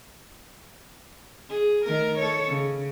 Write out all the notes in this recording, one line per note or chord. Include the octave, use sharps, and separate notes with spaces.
G#4
D#3 A3 A#4
A4 C#5
C#3